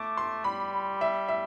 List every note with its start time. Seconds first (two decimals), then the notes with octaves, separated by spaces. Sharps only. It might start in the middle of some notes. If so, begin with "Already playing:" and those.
Already playing: A3 D6
0.17 C6
0.44 G3 B5
1.01 E5
1.28 E5